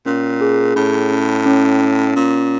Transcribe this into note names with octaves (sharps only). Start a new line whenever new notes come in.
A#2 C#4
G#4
A2 C#4
C#4
C#4
C#4
A#2 C#4